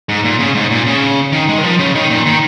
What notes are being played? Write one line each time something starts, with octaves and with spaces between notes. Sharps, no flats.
G#2
A#2
C#3
G#2
A#2
C#3
D#3
G#3
D#3
F3
C#3
D#3
A#2
D#3